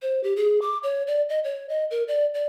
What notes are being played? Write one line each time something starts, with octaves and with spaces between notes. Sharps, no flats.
C5
G4
G#4
D6
C#5
D5
D#5
C#5
D#5
A#4
D5
D5